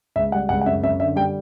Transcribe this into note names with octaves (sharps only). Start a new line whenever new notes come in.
C#2 E5
G3 F#5
C#2 F#5
F#5
F#2 E5
F#2 E5
D3 E5
G3 G5